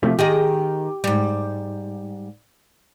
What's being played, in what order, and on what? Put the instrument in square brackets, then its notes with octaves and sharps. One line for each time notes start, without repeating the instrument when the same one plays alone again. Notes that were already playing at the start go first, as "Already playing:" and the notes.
[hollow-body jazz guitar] C3 F3 A3
[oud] D#3 G#4 D#5 [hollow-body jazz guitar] G4
[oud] G#2 G3